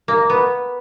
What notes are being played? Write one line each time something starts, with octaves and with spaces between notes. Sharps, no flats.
A#3
B3